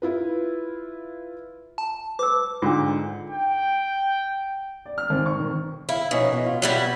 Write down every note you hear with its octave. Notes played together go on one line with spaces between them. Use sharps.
E4 F4 B4
A5
B4 D6 E6
G#2 D3 D4 F4
G5
D5
F6
G#1
C#6
D#3
E4 F5
B2 F3 C#4 D#4
E3 B3
F4
B2 F#3 G3 C4 E4 G4